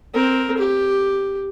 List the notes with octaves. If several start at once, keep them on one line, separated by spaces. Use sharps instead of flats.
C4 A#4
G4